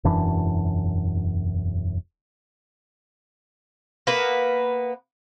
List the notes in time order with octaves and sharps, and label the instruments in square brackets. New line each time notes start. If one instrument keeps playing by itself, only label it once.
[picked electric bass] E1 F#2 E3 D4
[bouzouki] A#3 B3 B4